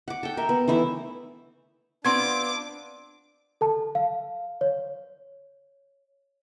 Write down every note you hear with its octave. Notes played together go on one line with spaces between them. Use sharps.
F#5 D6
A4 G5
A#4 E5
B3
E3 A3 E4 E5
B3 C4 D4 F4 C6 D6 G#6
A4 A5
F5
C#5